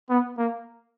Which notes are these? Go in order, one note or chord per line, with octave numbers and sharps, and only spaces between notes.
B3
A#3